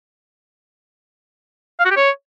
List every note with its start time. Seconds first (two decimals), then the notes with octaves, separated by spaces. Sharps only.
1.79 F5
1.85 F#4
1.91 G4
1.96 C#5